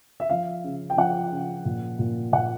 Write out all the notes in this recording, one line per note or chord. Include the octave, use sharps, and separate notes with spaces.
E5
F3 F5
C#3
G5
F3 F#5
C#3
A#2
A#2
A#2 F#5